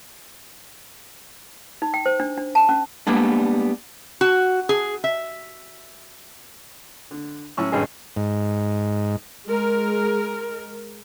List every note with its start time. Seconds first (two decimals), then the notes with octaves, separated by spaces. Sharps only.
1.82 D#4
1.94 G5
2.06 C5
2.20 D4
2.37 D4
2.55 A5
2.69 C#4
3.07 G3 G#3 A#3 B3 D4
4.21 F#4
4.69 G#4
5.04 E5
7.11 D3
7.57 A2 F#3 C#4 C#6 E6
7.72 G#1 G2 B2 D3 C#4 G#4
8.17 G#2
9.46 G#3 A#4